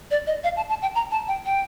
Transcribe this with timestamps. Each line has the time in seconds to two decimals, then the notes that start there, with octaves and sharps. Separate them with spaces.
0.11 D5
0.27 D#5
0.44 F5
0.56 A5
0.69 A5
0.82 G5
0.95 A#5
1.11 A5
1.28 G5
1.46 G5